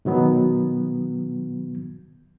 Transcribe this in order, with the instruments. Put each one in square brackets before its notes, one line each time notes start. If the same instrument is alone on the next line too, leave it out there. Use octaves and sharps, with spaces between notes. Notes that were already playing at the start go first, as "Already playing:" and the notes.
[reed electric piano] B2 D#3 F#3 B3